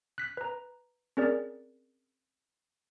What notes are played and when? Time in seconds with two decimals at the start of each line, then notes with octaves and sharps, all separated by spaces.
0.18 F#6 B6
0.37 B4 A#5
1.17 C4 C#4 G#4 A#4 D5